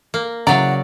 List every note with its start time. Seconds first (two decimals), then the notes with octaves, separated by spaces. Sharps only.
0.14 A#3
0.47 C#3 E3 F#3 D5 F#5 A#5